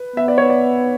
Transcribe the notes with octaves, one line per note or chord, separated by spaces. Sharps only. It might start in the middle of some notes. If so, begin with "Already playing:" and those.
Already playing: B4
B3 E5
D5
C#5
D5